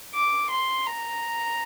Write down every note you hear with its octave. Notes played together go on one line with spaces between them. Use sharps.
D6
C6
A#5